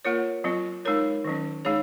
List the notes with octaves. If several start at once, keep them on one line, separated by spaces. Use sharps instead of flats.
A#3 F4 A#4 C#5
F#3 C4 F4
G#3 D#4 A#4 C#5
D#3 F#3 C#4
G#3 D#4 G#4 C#5